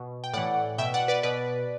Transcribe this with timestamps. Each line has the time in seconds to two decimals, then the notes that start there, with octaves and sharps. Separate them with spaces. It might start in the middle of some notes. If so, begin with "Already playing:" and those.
Already playing: B2
0.24 G5
0.33 A2 E3 D5 F#5
0.78 B2 E5 G5
0.94 D5 F#5
1.08 B4 D5
1.23 B2 B4 D5